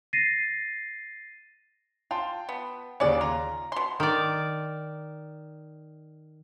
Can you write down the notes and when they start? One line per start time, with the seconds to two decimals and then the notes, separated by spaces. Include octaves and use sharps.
0.13 A6 A#6 C7 D#7
2.11 F4 G5 A5 C6
2.49 B3
3.00 D#2 C#3 C#4 D5
3.21 F4 A#5
3.72 B2 C6
4.00 D#3 D5